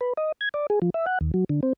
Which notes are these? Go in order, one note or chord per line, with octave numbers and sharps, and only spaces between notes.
B4
D#5
G#6
D5
G#4
F3
E5
F#5
D#2
F#3
D3
C4